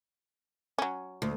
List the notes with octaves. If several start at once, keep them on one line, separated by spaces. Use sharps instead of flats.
F#3 C#4
D2